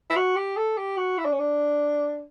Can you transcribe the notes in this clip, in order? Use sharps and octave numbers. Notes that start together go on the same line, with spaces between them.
E4
F#4
G4
A4
G4
F#4
E4
D4
C#4
D4